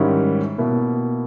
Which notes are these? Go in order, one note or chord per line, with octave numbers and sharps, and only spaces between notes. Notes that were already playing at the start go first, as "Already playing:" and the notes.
Already playing: G#2 D#3 G3 C#4 E4
B2 A#3 E4